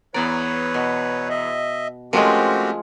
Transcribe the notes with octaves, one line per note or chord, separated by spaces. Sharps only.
E2 B3 B4 C#5 D5 A#5
B2
D#5 E5
F3 G#3 A3 C4 C#4 F#4 G4 A#4